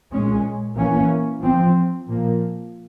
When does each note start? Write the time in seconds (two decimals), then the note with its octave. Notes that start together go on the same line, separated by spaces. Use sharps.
0.12 A#2 G#3 C#4
0.76 E3 A#3 C#4
1.40 F3 C4
2.05 A#2 F3 A#3